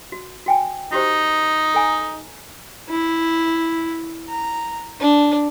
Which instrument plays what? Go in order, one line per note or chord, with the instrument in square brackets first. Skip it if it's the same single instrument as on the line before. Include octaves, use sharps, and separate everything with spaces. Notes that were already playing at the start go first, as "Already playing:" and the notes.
[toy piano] F#4
F#4 G5 G#5
[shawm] D#4 [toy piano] F#4 G4 C5
[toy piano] A4 G#5 A#5
[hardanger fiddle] E4
A#5
D4